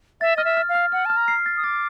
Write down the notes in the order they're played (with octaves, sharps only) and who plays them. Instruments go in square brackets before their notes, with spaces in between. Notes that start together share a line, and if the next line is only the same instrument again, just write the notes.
[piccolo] E5 [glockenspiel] A6
[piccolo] D#5 [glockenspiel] F6
[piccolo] E5
[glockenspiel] F6
[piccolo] F5
[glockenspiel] F6
[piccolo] F#5 [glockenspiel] F6
[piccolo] A5 [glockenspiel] F6
[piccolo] A#5
[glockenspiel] C7
A6
[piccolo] D#6
[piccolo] D6 [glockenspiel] A6